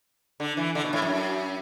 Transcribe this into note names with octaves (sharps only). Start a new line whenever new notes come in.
D3
E3
D3
B2
A2
F#2